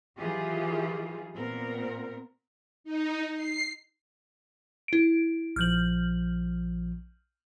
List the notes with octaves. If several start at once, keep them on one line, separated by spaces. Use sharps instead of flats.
D#3 E3 F#3 F4 G4 G#4
A#2 B3 C4 A#4
D#4
C7
E4 D7
A#1 F3 F6 G6 F#7